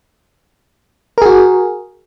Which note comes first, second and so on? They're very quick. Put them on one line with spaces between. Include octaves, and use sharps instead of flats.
A#4 G#4 F#4